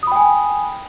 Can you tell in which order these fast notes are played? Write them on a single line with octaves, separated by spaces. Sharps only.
D#6 B5 G5 G#5